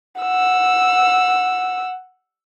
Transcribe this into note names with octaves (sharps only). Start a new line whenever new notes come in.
F#5 E6